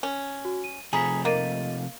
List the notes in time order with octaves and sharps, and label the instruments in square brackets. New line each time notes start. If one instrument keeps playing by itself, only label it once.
[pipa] C#4
[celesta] F#4
D#7
[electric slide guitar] C3 F3 A3 [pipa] G#4 [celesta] A#5 B5 B6
[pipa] A#3 [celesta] D#5 A6 D#7